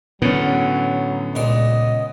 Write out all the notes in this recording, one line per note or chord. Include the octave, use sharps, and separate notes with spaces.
A2 D3 F#3 B3 C#4
C#2 A#2 D#5 C6